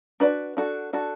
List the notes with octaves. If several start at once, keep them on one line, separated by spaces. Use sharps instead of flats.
D4 F#4 B4 D5
D4 F#4 A4
D4 F#4 A4